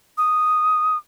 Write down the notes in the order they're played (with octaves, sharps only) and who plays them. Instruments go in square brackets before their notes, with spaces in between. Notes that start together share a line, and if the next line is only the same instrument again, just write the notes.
[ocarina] D#6